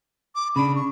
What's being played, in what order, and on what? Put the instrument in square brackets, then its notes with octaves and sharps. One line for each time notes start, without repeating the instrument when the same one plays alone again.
[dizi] D6
[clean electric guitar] C#3 D4 [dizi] B5
[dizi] C#6